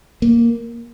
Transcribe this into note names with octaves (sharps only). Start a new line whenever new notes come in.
A#3